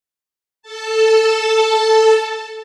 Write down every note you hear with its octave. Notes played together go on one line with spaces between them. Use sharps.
A4 A5